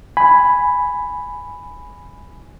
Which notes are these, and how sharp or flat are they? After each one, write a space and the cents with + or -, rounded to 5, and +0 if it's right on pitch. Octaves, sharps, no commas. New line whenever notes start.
G#5 +0 B5 +5